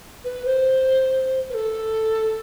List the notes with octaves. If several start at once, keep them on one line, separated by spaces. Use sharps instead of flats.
B4
C5
B4
A4